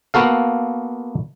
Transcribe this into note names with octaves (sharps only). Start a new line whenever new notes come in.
A#3 B3 F#4 A4 F5